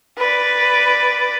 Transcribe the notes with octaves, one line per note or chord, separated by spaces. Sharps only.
B4 D5